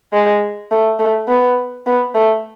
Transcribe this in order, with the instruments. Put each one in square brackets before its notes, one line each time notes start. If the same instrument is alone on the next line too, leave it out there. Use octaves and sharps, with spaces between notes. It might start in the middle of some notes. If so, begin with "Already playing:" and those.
[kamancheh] G#3
A3
A3
B3
B3
A3